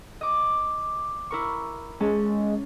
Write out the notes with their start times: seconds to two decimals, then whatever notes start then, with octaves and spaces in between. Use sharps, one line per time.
0.21 D#5 D6
1.31 E4 A#4 C#6
2.00 G#3 C#4 A5